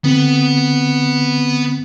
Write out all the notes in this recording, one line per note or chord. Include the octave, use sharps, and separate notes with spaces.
D3 B3 C4